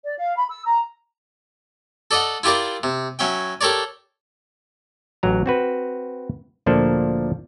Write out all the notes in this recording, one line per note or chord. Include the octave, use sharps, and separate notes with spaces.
D5
F5
B5
E6
A#5
A4 D5 D#5 F#5
E4 F4 G4 A#4 D5
C3
F#3 C#4 E5 G5
G4 A4 A#4 C#5 D5
A1 F#3 A#5
C4 F#4 B4
D2 A#2 F3 A#3 D4 A4